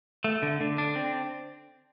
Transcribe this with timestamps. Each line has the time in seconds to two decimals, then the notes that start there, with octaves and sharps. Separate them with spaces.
0.24 A3
0.42 D3
0.61 D3
0.78 D4
0.95 C4